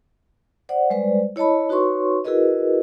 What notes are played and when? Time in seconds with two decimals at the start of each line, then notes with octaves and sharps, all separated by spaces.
0.69 C5 D5 F#5
0.90 G3 G#3 B4 C5 D5
1.36 E4 C#5 D#5 A5 B5
1.69 D#4 F#4 B4 C#5 C6 C#6
2.25 E4 F#4 G#4 A#4 B4 D#5